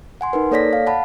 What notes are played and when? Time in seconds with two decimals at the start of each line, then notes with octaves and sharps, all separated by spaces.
0.21 F#5 G#5 C6
0.33 D#4 A#4 B4
0.51 A#3 A4 C#5 D5 A#6 B6
0.73 F5
0.87 F#5 A5 B5